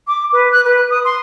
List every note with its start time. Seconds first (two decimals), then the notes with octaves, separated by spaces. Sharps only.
0.07 D6
0.32 B4
0.52 F#6
0.65 B4
0.90 D#6
1.04 C6